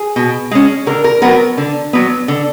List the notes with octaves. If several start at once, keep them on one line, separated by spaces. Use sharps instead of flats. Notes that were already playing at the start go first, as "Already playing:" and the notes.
Already playing: G#4
B2
G#3 C#4
D3 A#4
A#4
F#3 B3 A#4
D3
F#3 B3
D3